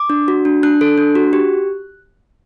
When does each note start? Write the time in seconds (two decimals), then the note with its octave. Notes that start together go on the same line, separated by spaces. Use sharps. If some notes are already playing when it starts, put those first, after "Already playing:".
Already playing: D6
0.10 D4
0.28 F#4
0.45 D4
0.63 D4 F#6
0.81 A4
0.98 D4
1.15 F#4
1.33 G4